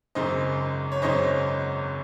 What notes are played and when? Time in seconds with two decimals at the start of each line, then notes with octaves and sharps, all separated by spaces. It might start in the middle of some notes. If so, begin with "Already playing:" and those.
0.15 G#1 F#2 C#3 C5 D#5
0.92 C#5
1.02 G#1 F#2 C#3 C5 D#5